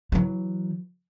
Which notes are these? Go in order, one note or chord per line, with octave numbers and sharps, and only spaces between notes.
E3 F#3